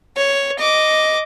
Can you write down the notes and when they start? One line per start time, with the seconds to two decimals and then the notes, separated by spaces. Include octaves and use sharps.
0.17 C#5
0.59 D#5 D6